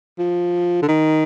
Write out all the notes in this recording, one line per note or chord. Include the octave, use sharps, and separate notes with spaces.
F3
D3
D#3